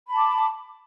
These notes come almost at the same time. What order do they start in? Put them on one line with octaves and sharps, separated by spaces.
B5 A5 D6